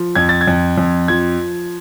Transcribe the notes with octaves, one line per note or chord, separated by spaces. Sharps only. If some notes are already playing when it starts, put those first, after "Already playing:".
Already playing: F3
F2 G#6
A6
G#6
F2
F2
F3 G#6